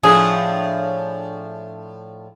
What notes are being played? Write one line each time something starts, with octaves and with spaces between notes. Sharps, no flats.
A2 F3 D4 G#4